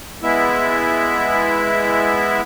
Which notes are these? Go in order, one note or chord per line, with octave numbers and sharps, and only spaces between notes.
G#3 B3 E4 E5